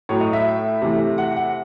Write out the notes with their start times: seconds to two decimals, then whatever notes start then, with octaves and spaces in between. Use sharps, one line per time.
0.09 A2 F#3 A3 C#5
0.21 D#5
0.33 E5
0.82 C3 E3 A3
1.18 F#5
1.36 F#5